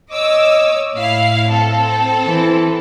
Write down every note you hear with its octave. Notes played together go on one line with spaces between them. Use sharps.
C#5 D#5 D6 E6
A2 E4 F5
C4 A4
E3